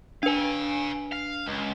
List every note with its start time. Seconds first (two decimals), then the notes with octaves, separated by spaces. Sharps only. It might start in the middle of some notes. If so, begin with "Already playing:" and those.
0.23 D4 B4 F5 G#5
1.12 F5
1.46 C#2